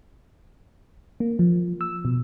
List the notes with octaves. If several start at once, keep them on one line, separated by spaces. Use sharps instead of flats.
A#3
F3
E6
B2